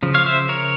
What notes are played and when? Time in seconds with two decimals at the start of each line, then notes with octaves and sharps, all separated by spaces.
0.03 C#3 F3
0.14 C#5 F5
0.26 C5 E5
0.49 A#4 C#5